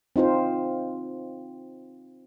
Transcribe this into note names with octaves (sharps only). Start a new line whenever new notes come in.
C4 D#4 F4 C5